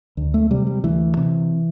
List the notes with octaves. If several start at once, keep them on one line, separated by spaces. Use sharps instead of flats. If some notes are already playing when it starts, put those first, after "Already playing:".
D2
A3
C3 G3
G3
D2 E3
C3